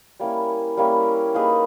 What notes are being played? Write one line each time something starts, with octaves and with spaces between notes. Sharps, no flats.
G3 A#3 C#4 E4
G3 A#3 C#4 E4
A#3 D#4 G#4 B4